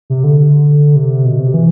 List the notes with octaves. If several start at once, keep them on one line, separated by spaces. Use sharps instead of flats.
C3
D3
C3
B2
C3
E3